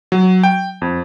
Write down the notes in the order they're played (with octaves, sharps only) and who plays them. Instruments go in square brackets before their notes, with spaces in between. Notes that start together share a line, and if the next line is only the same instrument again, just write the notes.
[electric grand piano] F#3
G5
F2